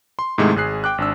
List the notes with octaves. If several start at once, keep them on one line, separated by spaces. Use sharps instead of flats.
C6
G#2 C3 D#3 G#3 A3 E4
G#1 G#4 F#6 C7
G5 D6 F#6
G#1 D4 E6